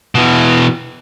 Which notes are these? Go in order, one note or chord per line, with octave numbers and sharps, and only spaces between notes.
B2 E3